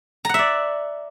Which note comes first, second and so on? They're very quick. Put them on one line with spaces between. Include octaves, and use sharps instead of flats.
A#5 F#5 E5 D5